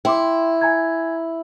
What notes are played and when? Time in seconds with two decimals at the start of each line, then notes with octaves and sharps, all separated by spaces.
0.05 E4 G5 C6 D6
0.61 G#5 A#5 G#6